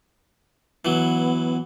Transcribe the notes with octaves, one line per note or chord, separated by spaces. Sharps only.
E3 F#3 B3